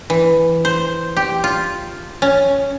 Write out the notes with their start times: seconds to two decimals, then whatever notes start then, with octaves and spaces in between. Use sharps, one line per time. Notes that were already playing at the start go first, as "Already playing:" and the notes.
0.10 E3
0.65 C5
1.17 G4
1.44 F4
2.22 C#4